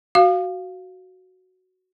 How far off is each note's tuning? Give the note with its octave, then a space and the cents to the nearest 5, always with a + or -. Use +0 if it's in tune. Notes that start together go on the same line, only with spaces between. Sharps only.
F#4 +0 F5 +0